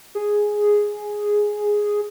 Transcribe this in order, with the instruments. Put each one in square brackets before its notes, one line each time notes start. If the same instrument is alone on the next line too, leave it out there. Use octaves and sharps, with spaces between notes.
[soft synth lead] G#4